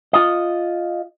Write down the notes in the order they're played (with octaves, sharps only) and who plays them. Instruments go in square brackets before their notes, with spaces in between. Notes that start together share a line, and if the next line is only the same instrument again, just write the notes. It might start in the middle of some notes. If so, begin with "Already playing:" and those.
[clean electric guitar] F4 D#5